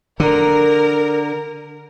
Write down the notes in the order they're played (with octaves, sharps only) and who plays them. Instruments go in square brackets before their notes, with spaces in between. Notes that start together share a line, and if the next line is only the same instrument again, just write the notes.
[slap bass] D3 [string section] A#4